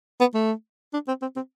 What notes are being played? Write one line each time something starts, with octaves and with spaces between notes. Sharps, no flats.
B3
A3
D4
C4
C4
C4